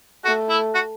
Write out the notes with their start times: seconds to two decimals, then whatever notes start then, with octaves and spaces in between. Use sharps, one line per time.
0.25 A3 F#4
0.49 E4
0.74 F#4